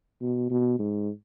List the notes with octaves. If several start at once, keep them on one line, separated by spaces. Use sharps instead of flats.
B2
B2
G#2